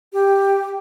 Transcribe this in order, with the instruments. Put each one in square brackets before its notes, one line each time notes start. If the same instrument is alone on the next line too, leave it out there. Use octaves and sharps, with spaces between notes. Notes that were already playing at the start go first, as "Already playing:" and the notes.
[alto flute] G4